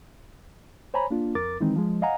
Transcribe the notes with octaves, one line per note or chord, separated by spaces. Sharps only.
C5 C#5 G#5 A#5 B5
A#3 D4 F4
F2 A#4 D6 A6
D#3 E3 G#3 C4 D#4
F3 G#3
D#5 F5 F#5 G#5 A#5